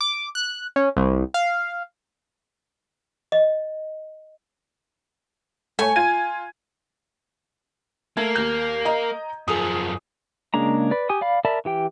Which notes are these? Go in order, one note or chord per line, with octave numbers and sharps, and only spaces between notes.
D6
F#6
C#4
C2
F5
D#5
A3 C#5 G#5
F4 G#6 D#7
A3 A#3 G#6
D#2 G6
D#5 A#5
F#2 F3 G#4 D#6
C#3 G#3 A#3 D4 A#5
B4 D5
G4 G#5 D#6
D5 F5 B5
A#4 D5 E5 A5 B5
E3 G4 G5